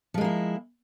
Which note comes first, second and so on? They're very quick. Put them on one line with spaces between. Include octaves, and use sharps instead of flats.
F3 G#3 A#3 E4